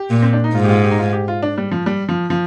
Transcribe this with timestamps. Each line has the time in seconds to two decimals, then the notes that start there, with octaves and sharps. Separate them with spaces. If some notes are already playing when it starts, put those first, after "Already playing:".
Already playing: G4
0.10 A#2
0.22 C4
0.33 D4
0.44 D#4
0.54 G#2 F4
0.64 G4
0.69 F4
0.84 G4
0.91 D#4
0.99 F4
1.13 G4
1.28 F4
1.43 D4
1.58 G3
1.71 F3
1.86 G3
2.09 F3
2.30 F3